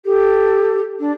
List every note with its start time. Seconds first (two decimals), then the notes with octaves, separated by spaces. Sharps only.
0.06 G4 A4
0.99 D4